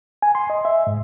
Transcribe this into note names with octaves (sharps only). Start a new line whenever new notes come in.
G#5
C6
D#5
E5
G#2